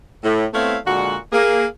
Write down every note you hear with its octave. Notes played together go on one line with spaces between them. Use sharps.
A2
A3 B3 C4 E4 C#5 F5
A#2 D3 G#3 F#4
A#3 G#4